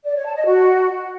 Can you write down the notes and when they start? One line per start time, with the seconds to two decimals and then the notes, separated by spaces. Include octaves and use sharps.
0.05 D5
0.15 C#5
0.25 A5
0.35 D#5
0.45 F#4